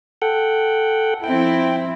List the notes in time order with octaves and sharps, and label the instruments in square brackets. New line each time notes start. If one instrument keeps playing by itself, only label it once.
[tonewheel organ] A4 F#5 G5
[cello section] F3 C4 E4 [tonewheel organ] G5